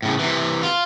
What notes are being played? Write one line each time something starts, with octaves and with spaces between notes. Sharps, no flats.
A2 C#3
C3 E3
F4